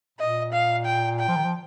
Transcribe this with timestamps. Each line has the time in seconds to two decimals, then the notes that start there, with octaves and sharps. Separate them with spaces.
0.19 A#2 D#5
0.53 F5
0.85 G5
1.19 G5
1.28 F3
1.36 D#3
1.45 F3